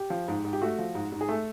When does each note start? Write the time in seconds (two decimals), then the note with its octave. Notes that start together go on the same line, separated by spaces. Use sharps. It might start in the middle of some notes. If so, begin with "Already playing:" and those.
Already playing: G4
0.10 F3
0.28 G#2
0.45 G#2
0.53 G4
0.62 A3 F#4
0.78 F3
0.95 G#2
1.12 G#2
1.21 G#4
1.28 A3 A4